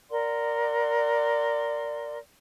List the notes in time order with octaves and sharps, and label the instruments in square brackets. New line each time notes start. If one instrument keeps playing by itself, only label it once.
[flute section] A#4 D5 F#5 C6